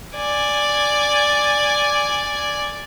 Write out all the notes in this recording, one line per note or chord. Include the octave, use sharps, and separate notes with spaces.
D5 G#5